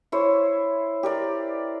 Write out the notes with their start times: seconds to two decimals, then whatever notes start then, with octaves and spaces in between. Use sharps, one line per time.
0.12 E4 C5 C#5
1.03 G4 A#4 D5